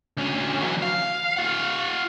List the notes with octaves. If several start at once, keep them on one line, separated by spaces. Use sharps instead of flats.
D2 C#4
E3 F#3
F5
F4 F#5